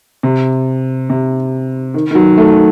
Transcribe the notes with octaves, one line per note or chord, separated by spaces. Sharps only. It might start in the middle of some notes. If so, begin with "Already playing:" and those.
C3
C3
D#3
D#3
F#3
A3